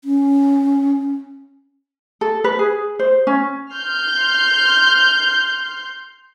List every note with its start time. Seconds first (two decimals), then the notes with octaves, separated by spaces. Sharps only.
0.04 C#4
2.21 A4
2.44 B4
2.59 G#4
2.99 C5
3.27 C#4
3.72 C6 F6 G6